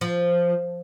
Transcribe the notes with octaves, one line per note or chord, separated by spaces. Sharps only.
F3